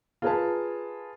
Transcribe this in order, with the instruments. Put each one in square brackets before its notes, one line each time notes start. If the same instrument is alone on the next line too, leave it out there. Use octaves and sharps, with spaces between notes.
[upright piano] F4 G#4 A#4 B4 G#5 A5